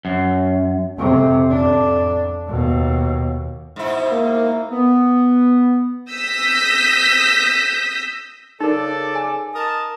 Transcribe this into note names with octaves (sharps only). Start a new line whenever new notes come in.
F#2
F2 C3
F2 D4
D#2 B2
G#2 B2 E4
A#3
B3
D#6 E6 G6 A#6 B6
C#3 D#4 A4 A#4 D5
G#5
A#4 D#5 A5